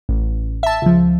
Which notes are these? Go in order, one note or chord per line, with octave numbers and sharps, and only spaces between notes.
A1
E5 A5
C#2 F3